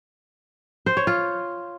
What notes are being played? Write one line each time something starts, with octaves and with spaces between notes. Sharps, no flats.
C5
C#5
F4